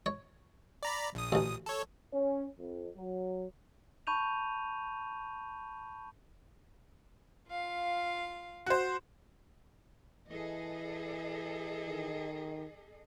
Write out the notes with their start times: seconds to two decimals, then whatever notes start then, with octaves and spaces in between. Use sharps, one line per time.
0.06 C#5
0.83 D5 A#5 B5
1.15 A#1 D#6
1.32 A1 D2
1.66 A4 C#5
2.13 C#4
2.59 F2
2.95 F#3
4.07 A5 B5 C#6 G6 D#7 F7
7.50 F4 F5
8.66 F#4 C5
10.28 E3 G#4 A4 D#5
11.88 D#3